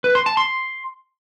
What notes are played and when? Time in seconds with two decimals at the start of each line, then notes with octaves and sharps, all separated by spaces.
0.04 B4
0.15 C6
0.26 A5
0.37 C6